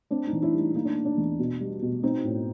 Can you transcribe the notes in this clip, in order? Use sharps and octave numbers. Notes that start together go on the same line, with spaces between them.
C4 D4
D#4
E3
D4 E4
G3
D#4
A#3 D#4
D4
A#3
D4
E2
B2
G3
B2
C4 D#4
A2